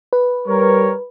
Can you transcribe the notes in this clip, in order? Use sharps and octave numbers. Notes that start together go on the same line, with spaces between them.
B4
G3 A#4 C#5